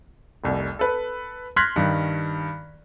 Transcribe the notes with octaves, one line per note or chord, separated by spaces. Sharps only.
F1 C2
A4 B4
C6 F6 F#6 G#6 A#6 B6
G2 D#3